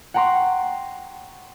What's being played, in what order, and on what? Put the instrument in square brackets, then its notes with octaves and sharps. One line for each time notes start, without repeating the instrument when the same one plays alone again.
[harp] F#5 G5 A#5 C6 C#6